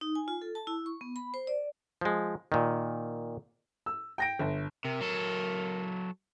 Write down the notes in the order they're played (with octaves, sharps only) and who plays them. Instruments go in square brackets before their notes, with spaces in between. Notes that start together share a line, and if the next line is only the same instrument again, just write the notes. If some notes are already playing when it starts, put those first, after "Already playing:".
[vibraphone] D#4
G#5
F4
A4
A5
E4
C#6
B3
B5
C5
D5
[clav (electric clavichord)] F3 G#3
A#2 D#3
[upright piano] E6
G5 A#6 D7
G1
[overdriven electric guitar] C3 [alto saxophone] A#4
[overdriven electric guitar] F#3 A4